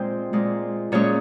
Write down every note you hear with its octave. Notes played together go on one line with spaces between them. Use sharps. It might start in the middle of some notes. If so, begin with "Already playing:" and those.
Already playing: A#2 G#3 C4 C5
A#2 G#3
A#2 G#3 C#4 C#5